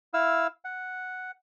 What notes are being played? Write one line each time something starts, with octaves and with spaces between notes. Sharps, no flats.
E4 F5 E6
F#5